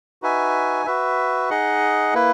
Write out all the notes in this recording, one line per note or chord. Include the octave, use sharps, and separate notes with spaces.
D#4 F#4 B4 E5 G#5
F#4 B4 E5
D#4 G#4 D#5 F#5
A#3 E4 B4